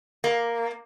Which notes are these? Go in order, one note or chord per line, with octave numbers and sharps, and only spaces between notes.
A#3